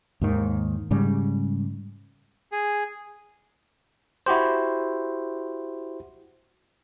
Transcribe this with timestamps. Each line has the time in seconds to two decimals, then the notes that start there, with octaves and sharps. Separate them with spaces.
0.21 D#2 G#2 D#3
0.91 G#2 C#3 G3
2.52 G#4
4.26 E4 F#4 G4 C5